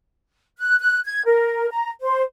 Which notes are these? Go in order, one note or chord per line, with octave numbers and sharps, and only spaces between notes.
F#6
F#6
G#6
A#4
A#5
C5